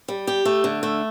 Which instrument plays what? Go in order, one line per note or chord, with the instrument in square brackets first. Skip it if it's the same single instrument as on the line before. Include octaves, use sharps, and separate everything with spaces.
[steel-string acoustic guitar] G3
G4
A3
D3
A3